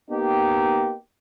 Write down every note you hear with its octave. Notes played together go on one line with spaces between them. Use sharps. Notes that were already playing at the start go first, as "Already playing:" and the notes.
A#3 B3 D#4 G4